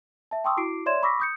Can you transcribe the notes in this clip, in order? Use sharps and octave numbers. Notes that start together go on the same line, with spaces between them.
E5 A5
G5 A5 C6 C#6 D#6 E6
E4 F#4 D6 C7 D7
C#5 D5 E5 C6 G#6 E7
B5 C#6 D6 E6 A#6 B6
D#6 G6 C#7